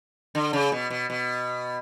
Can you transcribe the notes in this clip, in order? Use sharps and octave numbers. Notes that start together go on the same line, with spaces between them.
D3
C#3
B2
B2
B2